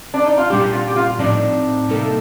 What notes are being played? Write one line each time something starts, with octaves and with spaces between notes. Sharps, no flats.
D4
D#4
F4
A#2 G3 D4 G4
F4
G4
F4
A2 F3 C4 D4 D#4
C3 G3 A#3 D#4 A4